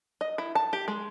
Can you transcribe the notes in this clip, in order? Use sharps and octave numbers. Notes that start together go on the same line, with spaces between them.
D#5
E4
A5
G4
G#3